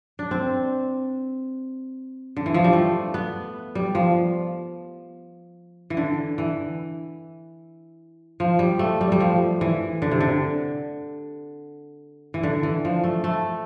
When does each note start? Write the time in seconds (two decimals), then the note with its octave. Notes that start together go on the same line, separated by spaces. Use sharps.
0.19 D4
0.31 C4
2.36 D3
2.46 E3
2.54 F3
2.64 G3
2.73 A3
3.14 B3
3.75 G3
3.95 F3
5.90 E3
5.97 D3
6.38 E3
8.40 F3
8.59 G3
8.79 A3
9.01 G3
9.12 G3
9.20 F3
9.61 E3
10.02 D3
10.11 C3
10.21 D3
12.34 E3
12.43 D3
12.63 E3
12.85 F3
13.04 A3
13.24 A3